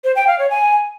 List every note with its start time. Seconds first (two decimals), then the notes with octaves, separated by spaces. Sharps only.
0.04 C5
0.16 G5
0.27 F5
0.39 C#5
0.50 G#5